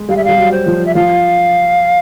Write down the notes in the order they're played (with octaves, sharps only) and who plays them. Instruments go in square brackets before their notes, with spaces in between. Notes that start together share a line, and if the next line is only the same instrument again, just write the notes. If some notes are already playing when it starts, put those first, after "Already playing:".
Already playing: [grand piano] G#3
[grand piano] G3 [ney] F5
[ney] E5
[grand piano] G3 [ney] F5
[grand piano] F#3
[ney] C5
[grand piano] F3
[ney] E5
[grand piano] F3 [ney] F5